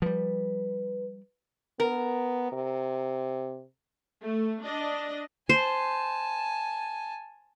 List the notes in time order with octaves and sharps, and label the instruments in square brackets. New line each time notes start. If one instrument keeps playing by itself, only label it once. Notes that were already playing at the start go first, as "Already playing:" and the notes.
[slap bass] F3 G3 [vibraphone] B4
[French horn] B3 [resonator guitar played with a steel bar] A#4
[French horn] C3
[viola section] A3
D4 D#5
[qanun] C5 [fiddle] G#5 A5